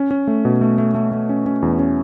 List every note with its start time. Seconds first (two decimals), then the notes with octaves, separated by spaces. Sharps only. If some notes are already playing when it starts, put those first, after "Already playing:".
Already playing: C#4
0.11 C#4
0.27 A3
0.45 B2
0.61 A3
0.78 A3
0.95 A3
1.12 A3
1.29 C#4
1.46 C#4
1.62 E2
1.79 C#4